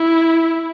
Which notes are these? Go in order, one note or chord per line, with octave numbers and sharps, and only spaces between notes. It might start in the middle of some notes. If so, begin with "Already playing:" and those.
Already playing: E4